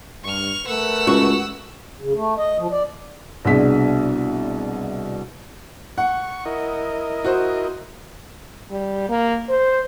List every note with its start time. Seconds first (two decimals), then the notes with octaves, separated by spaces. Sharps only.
0.24 G2 C#6 F6
0.67 A3 A#4 B4 F#5 E6
1.07 C#2 F#4
2.01 C#3
2.15 A3
2.38 D#5
2.58 F3
2.72 D5
3.45 C2 B2 D4 F#4 G#4 B6
5.98 F#5 C#6
6.45 E4 A#4 D#5
7.24 F#4 C5
8.71 G3
9.09 A#3
9.49 C5